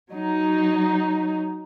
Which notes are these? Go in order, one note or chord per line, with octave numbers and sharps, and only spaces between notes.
F#3 D#4